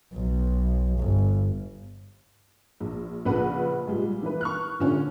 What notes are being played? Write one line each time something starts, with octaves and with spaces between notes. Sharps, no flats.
B1
G1
A#1
A#1 A#2 C#3 B4 F#5 B5
A#2 G3 G#3
E3 A#3 B4
C#6 F6 F#6
A#2 D3 C#4